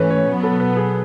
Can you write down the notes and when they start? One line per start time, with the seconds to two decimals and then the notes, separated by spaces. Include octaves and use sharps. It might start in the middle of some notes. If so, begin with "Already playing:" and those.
Already playing: G#2 E3 A3 C#4 B4
0.11 C#5
0.27 B2 F#3 B3
0.43 A4
0.60 B4
0.77 G#4